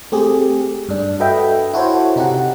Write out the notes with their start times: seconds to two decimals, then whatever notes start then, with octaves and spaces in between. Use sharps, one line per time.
0.12 A3 C4 G4 G#4
0.89 G2 D4
1.20 F#4 A4 B4 D#5 E5 G5
1.74 E4 F#4 A4 C5 C#5
2.16 C3 D#4 G4 F#5